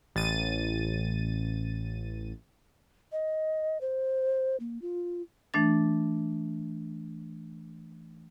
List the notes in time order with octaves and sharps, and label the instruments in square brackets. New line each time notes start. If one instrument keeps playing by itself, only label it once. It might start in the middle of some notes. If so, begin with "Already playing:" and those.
[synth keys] A1 A6 D#7
[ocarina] D#5
C5
A#3
F4
[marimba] E3 A3 D4 A6